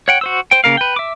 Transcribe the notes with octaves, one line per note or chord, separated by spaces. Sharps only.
C#5 F#5 G5
F#4 C5 E6
C5 G5
C#3 A#3 A#4 F5
B4 G5
E5 D6